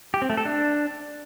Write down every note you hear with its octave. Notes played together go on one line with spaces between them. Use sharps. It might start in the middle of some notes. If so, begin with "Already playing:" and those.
G4
C4
A3
A4
D4